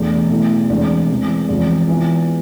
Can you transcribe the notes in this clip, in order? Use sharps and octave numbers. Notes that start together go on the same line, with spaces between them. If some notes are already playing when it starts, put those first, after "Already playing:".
Already playing: E2 B2 A3 D4
B2 A3 E4
E2 C3 G#3 D4
E2 C3 E3 G#3
E2 C3 F3 G#3
E3 B3 F4